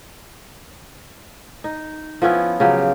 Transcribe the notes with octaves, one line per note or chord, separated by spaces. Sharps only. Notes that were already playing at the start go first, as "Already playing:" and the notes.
D#4
F3 B3 C#4 E4
C#3 F3 F#3 G4